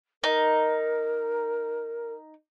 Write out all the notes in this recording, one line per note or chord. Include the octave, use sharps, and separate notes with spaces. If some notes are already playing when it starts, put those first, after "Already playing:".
D#4 A#4